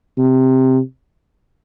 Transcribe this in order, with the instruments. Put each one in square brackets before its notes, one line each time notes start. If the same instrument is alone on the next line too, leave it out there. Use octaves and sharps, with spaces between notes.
[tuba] C3